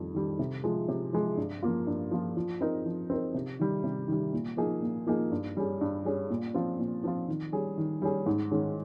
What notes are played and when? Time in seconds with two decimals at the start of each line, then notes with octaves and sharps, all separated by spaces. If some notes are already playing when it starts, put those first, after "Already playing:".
Already playing: F2 D#3 G3
0.14 D#3 G3
0.39 C3
0.64 F3 G#3
0.89 C3
1.13 F3 G#3
1.37 G2
1.62 F3 A#3 F4
1.87 G2
2.11 F3 A#3 F4
2.37 F3
2.61 C4 D#4 A#4
2.85 F3
3.10 C4 D#4 A#4
3.34 C3
3.59 D#3 G3
3.84 C3
4.08 D#3 G3
4.33 A#2
4.57 F3 A#3 D#4 G#4
4.82 A#2
5.07 F3 A#3 D#4 G#4
5.32 G2
5.57 G3 C#4 G#4
5.81 G2
6.05 G3 C#4 G#4
6.30 A#2
6.54 F3 C4 F4
6.79 A#2
7.04 F3 C4 F4
7.28 D#3
7.52 G3 C#4 G#4
7.78 D#3
8.02 G3 C#4 G#4
8.26 G#2
8.51 D#3 G#3 C#4